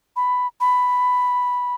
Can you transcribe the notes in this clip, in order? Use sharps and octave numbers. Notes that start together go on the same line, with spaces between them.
B5
B5